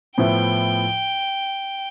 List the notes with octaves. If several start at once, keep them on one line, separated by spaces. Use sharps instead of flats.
A2 F3 B3 E4 G5